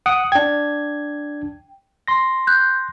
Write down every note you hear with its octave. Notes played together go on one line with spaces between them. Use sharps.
F#5 D#6 D7
D4 G5 G#6
C6 A#6
F#6 G6